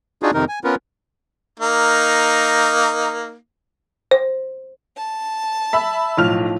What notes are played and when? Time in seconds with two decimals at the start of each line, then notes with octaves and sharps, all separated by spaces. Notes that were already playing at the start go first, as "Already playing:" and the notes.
0.23 D4 D#4 F4 F#4 G#4
0.34 F2 C3 D#3 D#4 A#4
0.49 G#5
0.64 B3 C#4 F4 A#4 B4
1.59 A#3 D#4
4.11 C5
4.96 A5
5.73 E5 B5 E6
6.17 B1 A2 F3 F6 F7